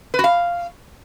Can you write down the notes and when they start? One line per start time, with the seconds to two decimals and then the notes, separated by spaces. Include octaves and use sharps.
0.14 B4
0.19 F#4
0.24 F5